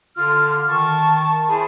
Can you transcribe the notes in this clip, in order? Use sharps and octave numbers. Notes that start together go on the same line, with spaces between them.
D3 F4 C6 F6
D#3 A5 C#6
E4 G#4 C5 A5 B5